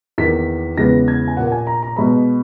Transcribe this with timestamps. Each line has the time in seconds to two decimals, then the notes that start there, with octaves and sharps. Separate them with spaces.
0.18 E2 D#3 A#3 B6
0.77 E2 C#3 G#3 B3 A#6
1.08 G#6
1.28 G#5
1.37 A#2 A#3 F#5
1.47 F#5
1.52 G#5
1.67 A#5
1.83 A#5
1.96 B2 G#3 B3 B5